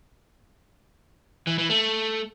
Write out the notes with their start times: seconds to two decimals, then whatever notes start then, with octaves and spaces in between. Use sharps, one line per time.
1.47 E3
1.58 E3
1.70 A3